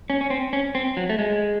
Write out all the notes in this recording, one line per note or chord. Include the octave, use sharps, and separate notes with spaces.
C#4
C#4
C4
C#4
C4
F#3
A3
G#3